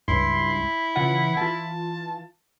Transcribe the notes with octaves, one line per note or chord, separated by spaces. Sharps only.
C#2 G2 E4 C6
C#3 E3 F4 F#5
E3 F4 A5